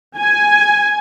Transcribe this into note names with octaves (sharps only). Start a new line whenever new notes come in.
G#5